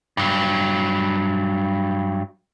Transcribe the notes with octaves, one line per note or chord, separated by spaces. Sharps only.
G2 F#3